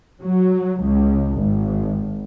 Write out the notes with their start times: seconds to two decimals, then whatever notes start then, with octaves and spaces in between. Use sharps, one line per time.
0.22 F#3
0.82 C#2
1.34 G#1